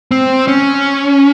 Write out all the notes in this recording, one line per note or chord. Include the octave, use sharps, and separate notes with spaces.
C4
C#4